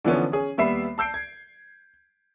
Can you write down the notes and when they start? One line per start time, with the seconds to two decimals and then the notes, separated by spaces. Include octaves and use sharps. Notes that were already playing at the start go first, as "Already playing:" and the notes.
0.04 D3 E3 F3 B3 C#4
0.32 C#4 G#4
0.58 D#2 G3 B3 E5 B5 C7
0.98 A5 E6 G6 C7 D7
1.14 G#6